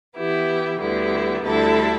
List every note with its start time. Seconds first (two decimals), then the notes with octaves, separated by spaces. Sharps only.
0.16 E3 B3 E4 G4
0.80 D2 D3 G3 B3 E4
1.43 D2 D3 G3 E4 A4